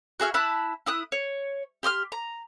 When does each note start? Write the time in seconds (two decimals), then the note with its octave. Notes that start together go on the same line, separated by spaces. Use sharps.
0.20 F#4 G#4 E5 F6
0.34 E4 A5 B5 F#6
0.86 E4 D#6 F#6
1.12 C#5
1.83 G4 C6 D#6 F6
2.12 A#5